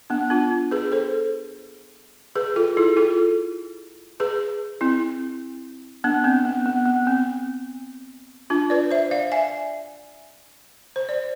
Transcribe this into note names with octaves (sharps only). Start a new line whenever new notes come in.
B3 D4
D4 F4
G#4 B4
A4 C5
G#4 B4
F4 A4
E4 G#4
F4 A4
G#4 B4
C4 E4
B3 D4
C4
B3
B3
B3
C4
D4 F4
B4 D5
C5 E5
D5 F5
E5 G#5
C5
D5